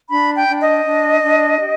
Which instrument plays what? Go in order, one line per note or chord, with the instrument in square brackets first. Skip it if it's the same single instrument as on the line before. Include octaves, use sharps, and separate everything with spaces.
[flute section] D4 B5
G5
D4
D#5
D4
D4
G4